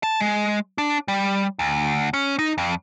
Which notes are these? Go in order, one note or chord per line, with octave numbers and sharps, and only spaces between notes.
A5
G#3
D4
G3
D2
C#4
D#4
F2